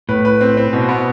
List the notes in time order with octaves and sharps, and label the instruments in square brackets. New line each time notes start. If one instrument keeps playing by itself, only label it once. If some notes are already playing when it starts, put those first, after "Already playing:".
[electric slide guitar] A2 [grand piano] B4
[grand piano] B4
C4
C4
B2
B3